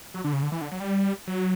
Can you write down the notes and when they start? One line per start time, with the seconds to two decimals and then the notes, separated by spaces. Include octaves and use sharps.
0.14 F#3
0.24 D3
0.33 C#3
0.42 D3
0.52 E3
0.61 D3
0.71 F#3
0.80 G3
1.27 F#3